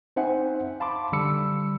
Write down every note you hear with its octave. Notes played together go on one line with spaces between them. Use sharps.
C4 D#4 C5 E5 F#5 G#5
F5 A5 B5 C6 D6
D3 G3 B5 E6 C#7